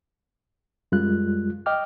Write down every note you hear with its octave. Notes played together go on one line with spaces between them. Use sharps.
F#2 G3 G#3 F4 F#6
D#5 G5 D6 F6